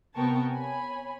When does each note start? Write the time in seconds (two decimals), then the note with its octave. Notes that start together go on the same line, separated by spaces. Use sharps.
0.14 C3 B3 A#4 G5 A5 C#6
0.51 C#5 G#5 B5